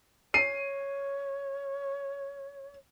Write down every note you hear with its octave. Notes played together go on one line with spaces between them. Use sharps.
C#5 C7 D#7